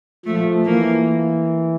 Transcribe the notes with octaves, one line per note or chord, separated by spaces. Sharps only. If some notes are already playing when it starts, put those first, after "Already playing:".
F3 A3
E3 A#3